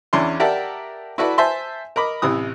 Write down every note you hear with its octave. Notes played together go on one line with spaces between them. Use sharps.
E2 C#4 D4 E4 C6
G4 A#4 D5 E5 F#5 A5
E4 F#4 A4 B4 D5 E5
C5 E5 G#5 A5 C6
A#4 D#5 B5 D6
A1 C3 E3 D#6